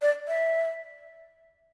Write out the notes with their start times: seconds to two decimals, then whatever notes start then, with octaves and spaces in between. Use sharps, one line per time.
0.02 D5
0.28 E5